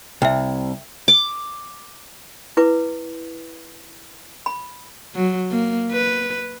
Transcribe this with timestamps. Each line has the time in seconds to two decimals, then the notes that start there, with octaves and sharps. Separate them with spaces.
0.22 C2 E5 G5
1.08 D6
2.57 E4 B4 D6
4.46 B5
5.15 F#3
5.51 A#3
5.92 B4